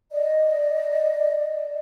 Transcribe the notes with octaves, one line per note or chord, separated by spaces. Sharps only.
D5 D#5